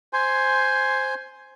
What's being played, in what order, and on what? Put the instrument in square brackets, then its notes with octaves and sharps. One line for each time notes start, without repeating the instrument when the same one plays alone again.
[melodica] C5 G#5 C6